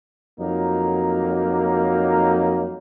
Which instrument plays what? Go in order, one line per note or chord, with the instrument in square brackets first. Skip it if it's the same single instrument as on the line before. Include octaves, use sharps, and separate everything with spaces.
[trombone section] F2 F#3 A#3 D#4